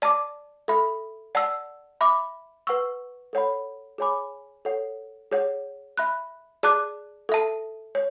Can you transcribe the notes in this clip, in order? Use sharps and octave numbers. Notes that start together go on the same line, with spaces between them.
D5 A5 D6
A4 E5 B5
D5 F#5 A5 E6
E5 B5 D6
B4 F#5 C#6 E6
A4 C#5 F#5 B5
G#4 C#5 G#5 B5 D6
A4 C#5 F#5
G#4 C#5 F#5
E5 B5 F#6
G#4 D5 A5 D6 F#6
A4 E5 A5
C#5